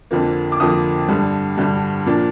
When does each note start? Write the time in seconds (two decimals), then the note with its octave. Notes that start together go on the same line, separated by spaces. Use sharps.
0.11 F2 D3 F3 A#3
0.52 D6
0.60 F2 D3 F3 A#3 D#6
1.09 G2 D3 G3
1.58 G2 D3 G3
2.06 A#2 F3 A#3 D4